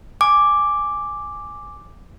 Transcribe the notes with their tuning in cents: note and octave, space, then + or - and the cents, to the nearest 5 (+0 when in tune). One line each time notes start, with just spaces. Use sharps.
G#5 +0 D6 +0